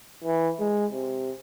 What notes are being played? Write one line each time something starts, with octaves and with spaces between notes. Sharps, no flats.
E3
G#3
C3